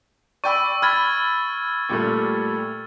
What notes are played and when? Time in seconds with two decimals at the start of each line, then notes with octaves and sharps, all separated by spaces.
0.44 D5 G5 B5 C#6 E6
0.82 B5 F6 G#6 A6
1.89 A#2 G3 A3